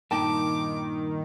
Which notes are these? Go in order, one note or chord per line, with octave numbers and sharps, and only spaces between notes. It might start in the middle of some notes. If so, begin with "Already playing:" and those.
G2 A#2 D#3 D#4 G5 A5 D6